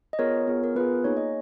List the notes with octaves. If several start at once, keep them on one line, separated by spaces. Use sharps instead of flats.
D#5
B3 F4 G#4 A#4 C#5
B3 F4 G#4
A#4
B3 F4 G#4 B4
A#3 D#4 G#4 C#5
D#5